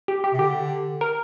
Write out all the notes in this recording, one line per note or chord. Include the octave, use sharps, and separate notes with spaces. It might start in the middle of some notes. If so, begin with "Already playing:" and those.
G4
G4
C3
D3 G4
A#4